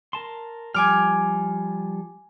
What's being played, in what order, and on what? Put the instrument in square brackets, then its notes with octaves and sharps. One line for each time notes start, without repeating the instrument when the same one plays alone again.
[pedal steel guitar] A#4 A5 C6
[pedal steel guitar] F3 G3 G5 [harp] G#5 D6 F6